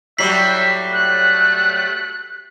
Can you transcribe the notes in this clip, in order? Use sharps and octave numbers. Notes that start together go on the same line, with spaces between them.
A2 F#3 G3 E5 B6 C7 F#7
A3 F#6